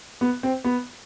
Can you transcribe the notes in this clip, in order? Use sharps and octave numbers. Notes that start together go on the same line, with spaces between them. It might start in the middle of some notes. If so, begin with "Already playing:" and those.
B3
C4
B3